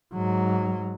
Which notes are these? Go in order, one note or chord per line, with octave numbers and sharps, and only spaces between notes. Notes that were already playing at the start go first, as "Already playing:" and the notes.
G#2 F#3